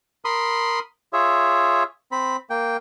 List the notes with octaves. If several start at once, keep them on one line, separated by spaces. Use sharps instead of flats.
A#4 B5 C6 D#6
F4 G#4 C#5 E5
C4 B5
A#3 G5